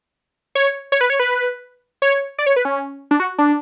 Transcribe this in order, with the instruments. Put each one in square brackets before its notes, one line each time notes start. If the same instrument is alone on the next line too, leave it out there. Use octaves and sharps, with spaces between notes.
[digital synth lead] C#5
C#5
B4
C#5
B4
C#5
D5
C#5
B4
C#4
D4
F#4
D4